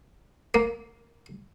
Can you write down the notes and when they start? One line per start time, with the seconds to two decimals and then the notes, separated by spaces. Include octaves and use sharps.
0.54 A#3